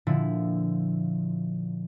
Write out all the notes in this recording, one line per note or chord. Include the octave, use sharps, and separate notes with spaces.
A#2 D3 F3 E4